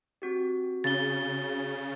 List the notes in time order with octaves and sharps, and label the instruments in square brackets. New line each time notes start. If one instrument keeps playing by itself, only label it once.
[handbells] C4 F#4 G4
[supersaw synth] C#3 [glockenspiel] A6 G7